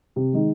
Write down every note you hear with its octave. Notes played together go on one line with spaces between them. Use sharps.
C3
D#3 G#3